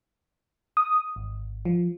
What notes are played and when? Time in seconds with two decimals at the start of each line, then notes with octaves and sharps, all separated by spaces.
0.77 D#6
1.16 G#1
1.65 F3